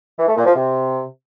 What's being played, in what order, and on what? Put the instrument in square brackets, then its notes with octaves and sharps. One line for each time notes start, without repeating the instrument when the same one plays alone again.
[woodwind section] E3
A3
A#2
F3
C3